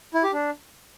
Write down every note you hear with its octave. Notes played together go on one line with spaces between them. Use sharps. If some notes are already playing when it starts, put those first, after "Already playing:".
E4
G4
D4